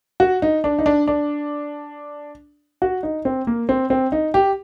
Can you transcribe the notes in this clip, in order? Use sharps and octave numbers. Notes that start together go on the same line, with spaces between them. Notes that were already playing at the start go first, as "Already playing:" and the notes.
F#4
D#4
D4
D#4
D4
D4
F#4
D#4
C4
A#3
C4
C4
D#4
G4